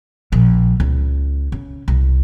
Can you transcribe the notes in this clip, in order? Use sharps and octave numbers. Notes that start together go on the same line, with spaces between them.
A#1
C#2
C#3
C2